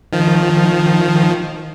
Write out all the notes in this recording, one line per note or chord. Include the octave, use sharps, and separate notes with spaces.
D#3 F3